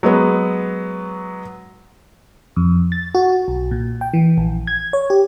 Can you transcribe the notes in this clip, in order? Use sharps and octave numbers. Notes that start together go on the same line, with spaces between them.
F#3 G#3 B3
F2
A6
F#4
B1
A#2
G5
E3
A#1
G#6
C#5
G4